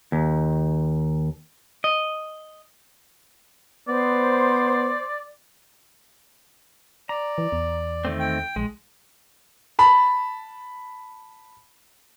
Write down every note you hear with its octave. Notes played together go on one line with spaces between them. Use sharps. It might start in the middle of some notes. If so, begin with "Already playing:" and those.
D#2
D#5
B3 C5 D5
D5 A#5
E3
E2
D#3 A3 C4
G5
A#1 G#3
A5 B5